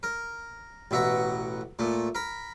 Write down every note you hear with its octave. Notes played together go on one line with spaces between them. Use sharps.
A#4
A1 B2 E5 F#5 A#5
A#2 A3
A#4 B5